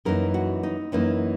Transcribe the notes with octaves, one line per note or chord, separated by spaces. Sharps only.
F#2 E3 A#3 D#4 A#4
F#4
D#4
F#2 E3 A#3 D#4